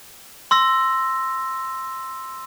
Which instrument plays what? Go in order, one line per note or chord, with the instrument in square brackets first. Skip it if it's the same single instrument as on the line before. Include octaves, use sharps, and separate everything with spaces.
[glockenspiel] C6 E6 A#6